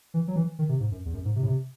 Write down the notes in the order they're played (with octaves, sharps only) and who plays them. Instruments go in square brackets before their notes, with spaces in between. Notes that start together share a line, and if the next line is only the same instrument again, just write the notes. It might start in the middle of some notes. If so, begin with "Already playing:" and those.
[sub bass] E3
F#3
E3
D#3
C3
G#2
F#2
E2
F#2
G#2
C3
A2
C3